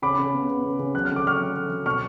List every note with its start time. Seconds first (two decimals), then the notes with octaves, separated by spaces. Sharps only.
0.02 C#3 B5 D6
0.19 C#3
0.33 B3
0.49 B3
0.64 C#3
0.79 C#3
0.95 F#3 F#6
1.05 D3 F6
1.16 D6
1.25 D3 C#6 F6
1.41 F#3
1.55 D3
1.70 F#3
1.86 B2 C#6 F6